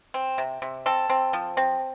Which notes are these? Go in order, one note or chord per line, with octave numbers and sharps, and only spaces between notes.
C4
C3
C3
C4 A4
C4
F3
C4